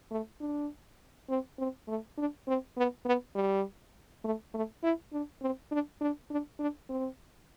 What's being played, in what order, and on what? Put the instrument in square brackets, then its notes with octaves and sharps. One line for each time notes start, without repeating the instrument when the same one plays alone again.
[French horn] A3
D4
C4
C4
A3
D4
C4
B3
B3
G3
A3
A3
E4
D4
C4
D4
D4
D4
D4
C4